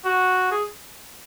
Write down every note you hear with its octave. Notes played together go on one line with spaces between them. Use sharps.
F#4
G#4